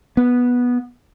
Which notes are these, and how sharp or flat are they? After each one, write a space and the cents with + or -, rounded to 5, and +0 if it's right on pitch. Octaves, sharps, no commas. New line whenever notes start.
B3 -10